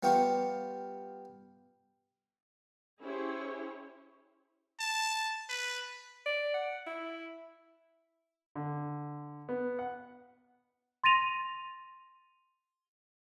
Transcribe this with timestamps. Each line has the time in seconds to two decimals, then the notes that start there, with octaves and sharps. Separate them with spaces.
0.03 G3 B3 F4 G4 C#6
3.02 C#4 E4 G4 G#4 C5 C#5
4.80 A5
5.49 B4
6.26 D5
6.54 F#5
6.87 E4
8.56 D3
9.49 B3
9.79 F#5
11.04 C6 A6 A#6 D#7 F7